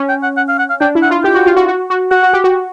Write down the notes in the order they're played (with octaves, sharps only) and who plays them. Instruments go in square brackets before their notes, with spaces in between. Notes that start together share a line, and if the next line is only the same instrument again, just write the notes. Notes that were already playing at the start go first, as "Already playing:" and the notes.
Already playing: [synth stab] C#4
[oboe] G5
F#5
F#5
F5
F#5
F5
[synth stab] D4 [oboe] G5
[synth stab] E4
[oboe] F#5
[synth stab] F4
[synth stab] G4 [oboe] G5
[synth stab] F#4
F4
F#4
F#4
F#4
[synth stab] F#4 [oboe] F#5
[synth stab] F#4
G4
F#4